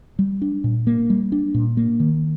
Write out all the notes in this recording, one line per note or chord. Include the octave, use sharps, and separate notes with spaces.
G3
D4
A#2
A#3
G3
D4
A#2
A#3
D#3